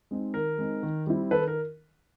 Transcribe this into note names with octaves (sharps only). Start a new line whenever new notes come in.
G#3 C4 D#4
D#3 A#4
G#3 C4 D#4
D#3
G3 C4 E4
D#3 A4 B4
A#4